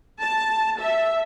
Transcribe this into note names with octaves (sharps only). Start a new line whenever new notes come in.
A5
E5